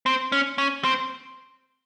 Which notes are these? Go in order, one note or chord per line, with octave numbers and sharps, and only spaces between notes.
C4
C#4
C#4
C4